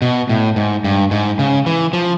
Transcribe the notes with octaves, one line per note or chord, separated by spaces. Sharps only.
B2
A2
G#2
G2
G#2
C#3
E3
F3